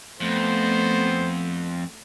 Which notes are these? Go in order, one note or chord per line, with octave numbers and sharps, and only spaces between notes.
F2 A3 B3 C5